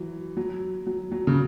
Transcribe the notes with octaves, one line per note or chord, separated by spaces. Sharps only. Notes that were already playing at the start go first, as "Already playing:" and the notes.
Already playing: E3 F#3
F#3
F#3
F#3
C#3